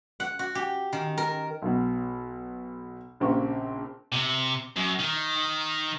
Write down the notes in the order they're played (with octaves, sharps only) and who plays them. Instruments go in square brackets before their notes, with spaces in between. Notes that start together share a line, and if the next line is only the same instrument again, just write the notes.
[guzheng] F#5
F#4
G4
D#3
A#4
[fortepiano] B1 B2
A#1 C#3 A#3 C4 G4 C#6
[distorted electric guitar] C3
F#2
D#3